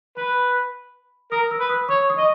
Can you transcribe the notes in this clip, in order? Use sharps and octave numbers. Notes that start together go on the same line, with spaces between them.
B4 B5
A#4 D#6
E6
B4
D#6
C#5 C#6
D#6
D#5 C#6